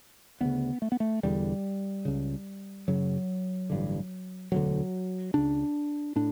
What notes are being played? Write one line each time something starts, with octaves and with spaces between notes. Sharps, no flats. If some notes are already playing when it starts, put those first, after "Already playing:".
D2 C#3 B3
A3
B3
A3
E1 E2 D3 G3
C#2 C#3
F#1 F#2 C#3 F#3
A1 G2 D3
E1 D2 D3 F#3
C#2 C#3 D4
A2 D4